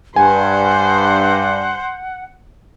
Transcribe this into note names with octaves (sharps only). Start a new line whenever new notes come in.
G2 C5 F#5 G#5